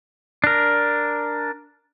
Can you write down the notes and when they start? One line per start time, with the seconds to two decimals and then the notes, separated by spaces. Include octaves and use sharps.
0.44 D4 A#4